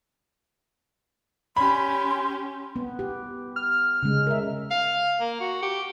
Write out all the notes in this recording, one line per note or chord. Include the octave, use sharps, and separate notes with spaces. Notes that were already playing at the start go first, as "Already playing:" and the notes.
C#4 G4 B5 C6
B3
G4
F6
C#3 G#3
A#4 E5
F5
A#3
F#4
G4